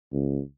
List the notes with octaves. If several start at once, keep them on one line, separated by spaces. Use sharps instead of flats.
C#2